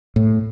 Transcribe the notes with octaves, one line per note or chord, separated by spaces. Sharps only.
A2